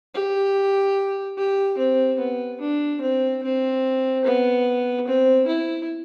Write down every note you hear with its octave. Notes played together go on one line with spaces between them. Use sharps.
G4
G4
C4
B3
D4
C4
C4
B3
C4
E4